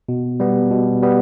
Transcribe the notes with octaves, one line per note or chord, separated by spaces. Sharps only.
B2
G3 B3
B2
G3 B3